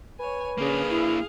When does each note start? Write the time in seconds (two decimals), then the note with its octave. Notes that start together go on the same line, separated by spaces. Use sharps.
0.20 B4 C#5 G#5
0.58 C#3 A#3 D4 G#4 F5
0.89 E4